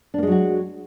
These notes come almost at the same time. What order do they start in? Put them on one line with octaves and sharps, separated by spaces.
D4 A#3 G#3 F#3 F#4